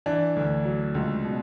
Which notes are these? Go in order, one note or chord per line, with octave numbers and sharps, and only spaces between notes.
E3 D4
D2
F#3
C#2
B2